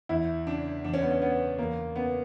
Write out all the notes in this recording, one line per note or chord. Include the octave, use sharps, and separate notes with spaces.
E2 E4
C#3 D4
E2 D4
C#4
B3
C#4
C#3 B3
E2 A#3
C#3 B3